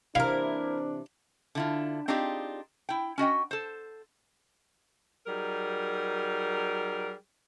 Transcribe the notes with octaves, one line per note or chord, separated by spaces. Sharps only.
C3 E3 A#3 D4 E4 A#4 F5
D3 E4 F4
C4 D4 D#4 F4 G4 G#4
E4 G5
C#4 F#4 D#5 G5
A4 C5
F#3 G3 D#4 G#4 A#4